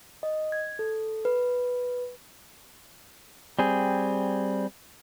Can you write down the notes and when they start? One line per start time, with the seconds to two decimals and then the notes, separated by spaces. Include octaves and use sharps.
0.23 D#5
0.52 G#6
0.79 A4
1.25 B4
3.59 G3 C4 G#4